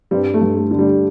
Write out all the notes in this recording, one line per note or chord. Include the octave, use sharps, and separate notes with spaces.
G2 G3 C4
A3
G2
A3
D3
G3